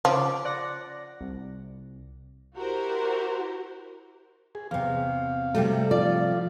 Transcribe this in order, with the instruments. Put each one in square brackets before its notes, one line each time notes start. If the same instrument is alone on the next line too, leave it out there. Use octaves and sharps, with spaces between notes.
[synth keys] C#3 D6 [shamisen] F3
[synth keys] D5 F#5 A#6
C2
[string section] E4 F#4 G4 A#4 C5
[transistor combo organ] G#4
[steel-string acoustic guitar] E2 C3 [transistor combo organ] F5
[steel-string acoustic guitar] C3 G3 F#4 [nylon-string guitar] A3
[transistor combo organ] F3 F4 [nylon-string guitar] D5